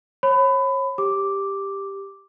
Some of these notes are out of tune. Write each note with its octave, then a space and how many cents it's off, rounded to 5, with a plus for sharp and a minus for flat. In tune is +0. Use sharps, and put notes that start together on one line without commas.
C#5 -35 B5 +25
G4 +10 D6 +0